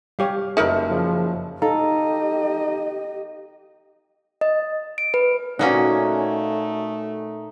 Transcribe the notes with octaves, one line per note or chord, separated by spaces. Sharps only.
G3 G4 C#5 F5
F#1 D#4 A#4 B4 E5
C#3 F3
D#4 G4 A4 D#5 F5 A#5
D#5
D7
B4
A#2 A3 A#3 C#4 D#4 F#4 F#5